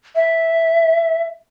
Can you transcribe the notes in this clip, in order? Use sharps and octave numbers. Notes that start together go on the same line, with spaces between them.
E5